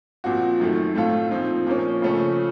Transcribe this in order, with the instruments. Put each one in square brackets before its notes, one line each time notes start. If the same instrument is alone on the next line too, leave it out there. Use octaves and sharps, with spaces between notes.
[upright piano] A#2 F3 C4 F#4
F#2 D#3 A3
A2 A3 C4 F4 A4
A#2 F3 C4 D#4
A#2 F3 A#3 C#4
C#3 F3 A3 C#4 A4